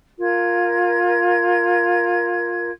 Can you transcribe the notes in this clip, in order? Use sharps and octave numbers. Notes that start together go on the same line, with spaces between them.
F4 A#4 G#6